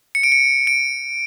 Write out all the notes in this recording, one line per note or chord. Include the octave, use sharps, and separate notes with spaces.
C#7
D7
C#7
D7